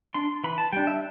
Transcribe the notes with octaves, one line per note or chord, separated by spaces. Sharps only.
D4 C6
E3 B5
A5
G3 D4 G5
E5